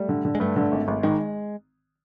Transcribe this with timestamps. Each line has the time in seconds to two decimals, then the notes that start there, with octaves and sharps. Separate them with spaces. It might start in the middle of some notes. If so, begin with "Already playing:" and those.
Already playing: G3 A3
0.09 D3
0.25 D3
0.35 G#3
0.40 G2 A3
0.56 D3
0.72 G#1
0.88 G#1
1.03 D#3 G#3